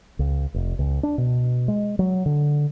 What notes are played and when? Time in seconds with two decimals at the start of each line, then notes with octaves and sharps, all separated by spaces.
0.19 C#2
0.54 F1
0.79 C#2
1.03 D4
1.18 B2
1.68 G#3
1.99 F#3
2.26 D3